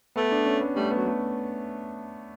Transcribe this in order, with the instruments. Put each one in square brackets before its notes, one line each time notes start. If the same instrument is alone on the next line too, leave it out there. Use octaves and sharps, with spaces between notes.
[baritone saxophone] A3 [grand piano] B3
[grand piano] D4
C#4
B3
[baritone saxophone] G3 [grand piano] A3
[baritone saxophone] F#3 [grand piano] B3
[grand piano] A3